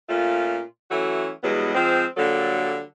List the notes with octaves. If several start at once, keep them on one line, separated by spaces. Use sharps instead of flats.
A#2 A3 C#4 F4
E3 F#3 A3 C#4 F#4
E2 G2 F#3 G#3 B3
F3 G#3 C4
D3 F#3 G3 A#3 A4